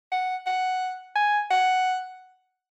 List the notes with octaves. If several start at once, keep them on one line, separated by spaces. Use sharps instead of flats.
F#5
F#5
G#5
F#5